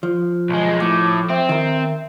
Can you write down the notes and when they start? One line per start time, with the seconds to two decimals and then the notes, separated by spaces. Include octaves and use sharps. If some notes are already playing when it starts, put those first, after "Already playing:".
0.03 F3
0.50 B1 G#3
0.80 A2 D6
1.29 C4 E5
1.49 D#3 A#4